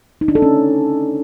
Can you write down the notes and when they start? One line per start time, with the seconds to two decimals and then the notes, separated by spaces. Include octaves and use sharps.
0.21 D#4
0.28 D4
0.35 A4
0.42 C#4